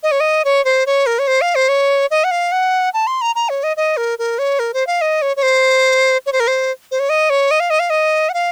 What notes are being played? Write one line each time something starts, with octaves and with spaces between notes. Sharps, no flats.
D#5
C#5
D#5
C#5
C5
C#5
A#4
C#5
C5
F5
C5
C#5
D#5
F#5
F5
F#5
A5
C6
A#5
A#5
C#5
D#5
D#5
A#4
A#4
C#5
A#4
C5
F5
D#5
C#5
C#5
C5
C#5
C5
A#4
C5
C5
C#5
D#5
C#5
D#5
F5
D#5
F5
D#5
F#5
F5